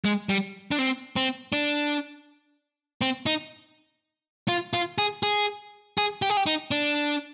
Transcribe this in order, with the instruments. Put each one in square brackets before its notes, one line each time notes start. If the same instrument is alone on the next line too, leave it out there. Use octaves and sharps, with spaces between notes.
[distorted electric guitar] G#3
G3
D4
C4
C4
D4
C4
D#4
F4
F4
G#4
G#4
G#4
G4
G#4
G4
D#4
D4